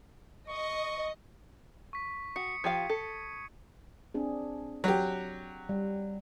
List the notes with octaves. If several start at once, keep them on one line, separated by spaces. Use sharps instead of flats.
D#5 C#6
C#6 B6
F#4 D#6 C#7
F3 G4 F5 G#6 D#7
A4
C4 D4 G#4
F#3 G4
G3